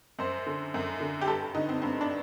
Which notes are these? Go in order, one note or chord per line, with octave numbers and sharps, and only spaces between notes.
F#2 C5
D3
F#2
D3
G4
G2 A4
D3 D#4
C4
G2 C4
D4